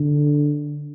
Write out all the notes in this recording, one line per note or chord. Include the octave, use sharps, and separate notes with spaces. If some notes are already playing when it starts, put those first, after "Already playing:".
Already playing: D3